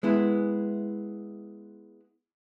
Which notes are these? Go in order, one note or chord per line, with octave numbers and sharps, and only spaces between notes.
G#3 B3 E4